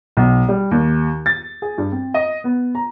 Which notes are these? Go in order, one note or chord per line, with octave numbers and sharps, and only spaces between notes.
B1
G3
D#2
A6
G#4
G2
C4
D#5
B3
A#5